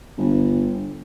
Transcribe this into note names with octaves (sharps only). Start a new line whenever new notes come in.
G1